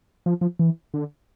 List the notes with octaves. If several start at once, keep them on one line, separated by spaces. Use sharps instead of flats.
F3
F3
E3
D3